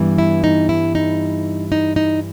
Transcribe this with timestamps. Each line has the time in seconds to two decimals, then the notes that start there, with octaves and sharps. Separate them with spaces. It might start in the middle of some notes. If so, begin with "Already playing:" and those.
Already playing: G2 E3 G3 B3
0.18 E4
0.44 D#4
0.69 E4
0.95 D#4
1.72 D#4
1.96 D#4